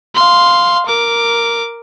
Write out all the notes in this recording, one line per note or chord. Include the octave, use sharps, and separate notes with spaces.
F5 C6
A#4 D6